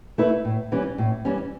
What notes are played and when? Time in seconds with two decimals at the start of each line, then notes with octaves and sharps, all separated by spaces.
0.18 A3 E4 B4
0.45 A2
0.72 E3 G3 C#4
0.98 A2
1.25 E3 G3 C#4